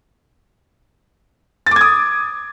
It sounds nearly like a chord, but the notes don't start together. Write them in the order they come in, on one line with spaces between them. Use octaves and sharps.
A6 D6 G#6 D#6